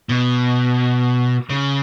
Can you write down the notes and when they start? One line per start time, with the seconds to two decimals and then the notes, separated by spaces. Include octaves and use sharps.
0.09 B2
1.49 C#3